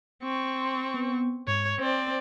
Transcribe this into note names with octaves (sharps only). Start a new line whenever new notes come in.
C4 C#6
C6
B3
G#2 C#5
C4 C5 D5